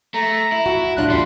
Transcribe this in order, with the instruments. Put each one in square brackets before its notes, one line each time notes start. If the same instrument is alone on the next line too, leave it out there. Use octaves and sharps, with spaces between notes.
[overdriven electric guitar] A3 [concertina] A#5
[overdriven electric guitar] E4
[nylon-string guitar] F#4
[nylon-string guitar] A2 D4 F4 [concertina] F#6
[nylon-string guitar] E2 [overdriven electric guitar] G3 G4 [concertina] C6